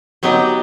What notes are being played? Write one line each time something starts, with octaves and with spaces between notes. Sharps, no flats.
F#3 B3 D#4 G4